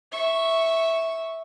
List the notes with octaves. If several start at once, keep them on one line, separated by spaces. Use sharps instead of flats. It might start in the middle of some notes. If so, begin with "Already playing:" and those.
E5 C#6